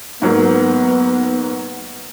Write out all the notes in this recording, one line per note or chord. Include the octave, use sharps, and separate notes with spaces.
G#2 F#3 A#3 B3